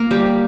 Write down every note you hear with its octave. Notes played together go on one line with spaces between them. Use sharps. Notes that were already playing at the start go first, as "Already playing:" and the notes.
Already playing: A#3 A#4
G3 G4